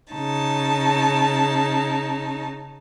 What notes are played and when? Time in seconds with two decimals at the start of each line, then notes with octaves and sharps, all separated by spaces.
0.13 C#3 D#4 A5